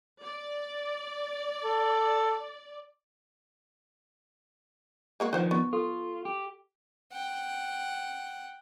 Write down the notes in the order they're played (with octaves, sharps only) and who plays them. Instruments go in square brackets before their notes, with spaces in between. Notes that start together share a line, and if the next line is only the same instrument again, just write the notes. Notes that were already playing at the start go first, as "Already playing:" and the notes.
[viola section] D5
[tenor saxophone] A4
[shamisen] G#3 A#3 F#4
[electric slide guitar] D#3 F3 [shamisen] B4 C5 F#5
[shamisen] B3 [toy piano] C#6
[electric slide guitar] F4 [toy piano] A4
[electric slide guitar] G4
[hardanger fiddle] F#5 G5